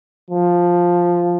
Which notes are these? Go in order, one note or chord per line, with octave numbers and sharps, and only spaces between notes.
F3